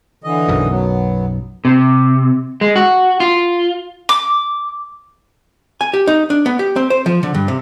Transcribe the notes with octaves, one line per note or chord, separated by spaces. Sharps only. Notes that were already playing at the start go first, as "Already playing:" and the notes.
D3 E3 D#5
B1 F#2
F#3 B3
C3
G#3
F#4
F4
D6
G#5
G4
D#4
D4
B3
G4
C4
C5
F3
D3
G2
C3